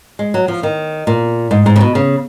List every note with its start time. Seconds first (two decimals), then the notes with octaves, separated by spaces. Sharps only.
0.19 G#3
0.34 F#3
0.48 F3
0.63 D#3
1.07 A#2
1.51 G#2
1.66 G#2
1.76 C#3
1.81 B2
1.95 C#3